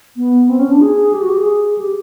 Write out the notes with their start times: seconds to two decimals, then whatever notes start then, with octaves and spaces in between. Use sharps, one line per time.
0.17 B3
0.49 C4
0.59 C#4
0.70 D4
0.81 G#4
1.13 G4
1.22 F#4
1.29 G4
1.38 G#4
1.78 G4